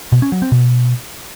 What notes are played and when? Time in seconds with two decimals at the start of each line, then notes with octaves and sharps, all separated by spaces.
0.12 B2
0.22 C#4
0.32 F#3
0.42 C4
0.52 B2